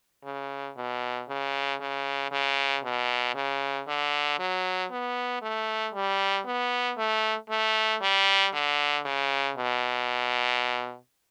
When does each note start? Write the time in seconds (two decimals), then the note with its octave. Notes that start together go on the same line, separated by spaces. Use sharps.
0.24 C#3
0.77 B2
1.28 C#3
1.80 C#3
2.32 C#3
2.83 B2
3.35 C#3
3.88 D3
4.39 F#3
4.91 B3
5.42 A3
5.94 G3
6.46 B3
6.98 A3
7.50 A3
8.01 G3
8.54 D3
9.05 C#3
9.57 B2